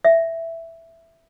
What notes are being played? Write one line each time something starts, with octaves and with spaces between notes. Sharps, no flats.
E5